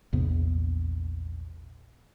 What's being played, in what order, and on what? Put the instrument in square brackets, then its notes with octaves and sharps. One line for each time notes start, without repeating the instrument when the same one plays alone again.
[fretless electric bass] A#1 E2 C3 B3